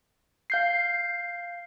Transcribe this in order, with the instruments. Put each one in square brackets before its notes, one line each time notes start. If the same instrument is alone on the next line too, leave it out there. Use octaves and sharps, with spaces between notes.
[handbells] F5 G6 C7